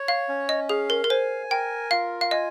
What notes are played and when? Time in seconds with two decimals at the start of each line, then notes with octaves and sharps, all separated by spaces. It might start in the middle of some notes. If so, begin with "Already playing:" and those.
Already playing: C#5
0.08 F5
0.29 C#4
0.49 D#5
0.69 G#4 F5
0.90 A#4
1.04 A#4
1.10 C5 G#5
1.50 A#4 G5
1.91 F4 F5
2.21 F5
2.31 D#5 G#5